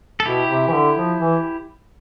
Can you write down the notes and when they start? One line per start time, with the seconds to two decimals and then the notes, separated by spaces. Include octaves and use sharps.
0.20 A4
0.25 B2 E4 G4
0.49 C3
0.67 E3
0.73 D3
0.96 F3
1.18 E3